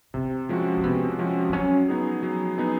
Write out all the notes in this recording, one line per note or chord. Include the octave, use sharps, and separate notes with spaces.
C3 B3
F3 G#3 C#4 F#4
C4
C3 B3
F3 G#3 C#4 F#4
C4
F#3 C#4
B3 D#4 G#4
F#3
B3 D#4 G#4